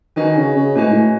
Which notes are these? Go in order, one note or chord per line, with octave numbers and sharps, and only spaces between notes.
D#3 C#4 F#4 B4 D#5 G#5
C#3
C#3
A2 C#4 F#4 B4 D#5 G#5
G#2
A2